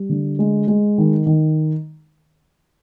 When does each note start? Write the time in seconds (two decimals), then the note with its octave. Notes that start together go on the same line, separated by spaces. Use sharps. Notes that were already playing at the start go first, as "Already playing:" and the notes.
Already playing: G3
0.09 D3
0.39 G#3
0.68 G#3
0.98 D#3
1.26 D#3